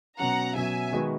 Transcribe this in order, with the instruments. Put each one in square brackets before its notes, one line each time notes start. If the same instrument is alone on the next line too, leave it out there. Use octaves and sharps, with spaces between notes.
[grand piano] B2 F#3 C#4 [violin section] F#5 A#5
[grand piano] B2 F#3 C#4 [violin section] E5 G#5
[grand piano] D#3 G#3 B3 D#4 F#4